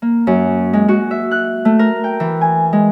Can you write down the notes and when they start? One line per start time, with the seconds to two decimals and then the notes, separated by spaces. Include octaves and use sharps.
0.02 A#3
0.27 F#2
0.73 G#3
0.88 F#4
1.11 E5
1.31 F#6
1.65 A3
1.79 A#4
2.04 G5
2.20 E3
2.41 G#5
2.73 G#3